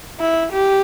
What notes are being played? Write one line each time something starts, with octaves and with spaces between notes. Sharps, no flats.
E4
G4